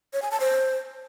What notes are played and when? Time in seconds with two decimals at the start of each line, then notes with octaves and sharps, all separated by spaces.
0.13 C#5
0.22 G#5
0.31 A5
0.40 C5